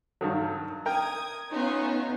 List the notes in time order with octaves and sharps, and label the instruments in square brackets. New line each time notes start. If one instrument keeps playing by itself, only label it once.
[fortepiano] G2 D#3 F#3
[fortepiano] A#4 G5 [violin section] D#6 G#6
[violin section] A3 C#4 F4 [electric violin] B3 D#4